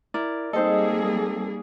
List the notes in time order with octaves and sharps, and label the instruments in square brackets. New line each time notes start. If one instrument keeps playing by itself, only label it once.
[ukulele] E4 [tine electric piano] A#4 D5
[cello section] G3 A#3 G#4 [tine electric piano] C4 A4 [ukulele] D#4 C5 D#5